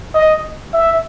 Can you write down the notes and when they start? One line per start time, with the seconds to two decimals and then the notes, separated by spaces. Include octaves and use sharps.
0.15 D#5
0.73 E5